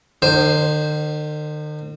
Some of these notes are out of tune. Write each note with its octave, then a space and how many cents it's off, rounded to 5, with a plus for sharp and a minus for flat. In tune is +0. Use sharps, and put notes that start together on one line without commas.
D#3 -45 C5 +0